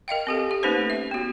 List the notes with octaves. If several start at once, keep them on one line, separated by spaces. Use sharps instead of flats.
A#4 D#5 F5 G5
C4 G4 A4
G4
A3 A#3 C#4 D#4 B4 C5
E5
B3 F#4